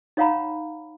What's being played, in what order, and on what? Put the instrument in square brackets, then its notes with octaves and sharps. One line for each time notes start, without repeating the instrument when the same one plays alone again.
[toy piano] D#4 C#5 F5 F#5 A#5 B5